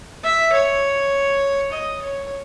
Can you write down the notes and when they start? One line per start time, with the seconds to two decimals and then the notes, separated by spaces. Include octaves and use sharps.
0.23 E5
0.52 C#5
1.72 D#5
2.02 C#5